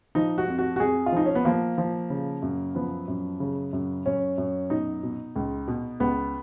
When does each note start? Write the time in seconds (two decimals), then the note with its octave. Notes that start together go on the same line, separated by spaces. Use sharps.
0.15 F3 D#4
0.38 F#4
0.48 F2
0.59 F#4
0.76 F#4
0.80 F2 G#4
1.06 F4
1.12 F3 D#4
1.26 C#4
1.35 B3
1.45 F3 A#3
1.78 F3
2.10 C#3
2.42 F#2
2.75 F3 B3
3.08 F#2
3.40 C#3
3.73 F#2
4.06 F#2 C#4
4.38 F#2
4.70 B2 D#4
5.03 B2
5.36 C#2
5.68 B2
6.00 C#2 B3